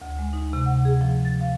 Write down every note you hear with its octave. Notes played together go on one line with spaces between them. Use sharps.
D2
G#3
D#4
C3
F#5
G#4
F3
A6
F5